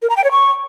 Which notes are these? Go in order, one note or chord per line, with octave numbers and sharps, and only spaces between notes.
A#4
A#5
G5
C#5
C#6